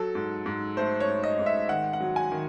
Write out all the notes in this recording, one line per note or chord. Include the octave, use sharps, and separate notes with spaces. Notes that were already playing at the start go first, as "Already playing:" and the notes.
Already playing: F#3 A4
G#2
G#2
A3 C5
C#5
G#2
D#5
G#2
E5
D#3 F#5
F#5
F#3
G#5
D#3